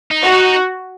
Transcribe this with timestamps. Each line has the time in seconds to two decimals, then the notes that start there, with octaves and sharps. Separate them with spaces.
0.11 D#4
0.23 F#4
0.32 D#4